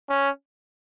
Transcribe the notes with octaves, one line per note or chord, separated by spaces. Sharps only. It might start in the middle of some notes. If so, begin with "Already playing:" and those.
C#4